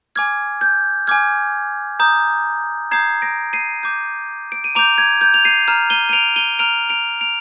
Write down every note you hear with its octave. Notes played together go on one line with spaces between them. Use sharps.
G#5 D6 F6 G#6
G6
G#5 D6 F6 G#6
A#5 D#6 G6
A#5 D#6 G6 G#6 C7
A#6 D7
C7 D#7
A#5 D6 G6
D7
D#7
A#5 D6 G6 D7 F7
G#6
G6
F7
C7 D#7
A#5 F6
D#7 G7
D#7
D7 F7
D#7 G7
A#5 F6 D7 F7
D7 F7
D7 F7